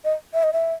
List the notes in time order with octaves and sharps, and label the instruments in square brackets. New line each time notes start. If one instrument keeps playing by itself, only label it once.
[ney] D#5
E5
D#5
E5